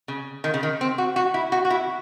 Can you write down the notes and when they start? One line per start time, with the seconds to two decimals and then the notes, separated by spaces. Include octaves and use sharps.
0.08 C#3
0.44 D#3
0.54 C#3
0.63 D#3
0.81 C4
0.98 F#4
1.16 F#4
1.34 E4
1.52 F#4
1.65 F#4
1.70 E4